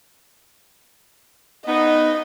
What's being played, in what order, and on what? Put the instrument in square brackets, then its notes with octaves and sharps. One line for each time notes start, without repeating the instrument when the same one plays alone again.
[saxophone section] B3 D#4 [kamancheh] D#5